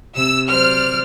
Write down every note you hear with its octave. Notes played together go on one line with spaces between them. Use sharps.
C3 E6
F#3 C5 D5 F6